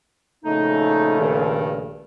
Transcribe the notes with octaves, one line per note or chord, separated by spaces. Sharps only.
A#1 C#3 A3 D#4
G2 A#2 D#3